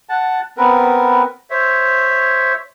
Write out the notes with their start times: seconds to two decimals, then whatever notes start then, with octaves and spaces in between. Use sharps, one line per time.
0.09 F#5 A5
0.57 B3 C4 A#4 B4
1.50 C5 C#5 E5